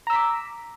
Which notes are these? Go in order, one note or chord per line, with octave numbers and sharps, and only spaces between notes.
A#5 D6 E6 B6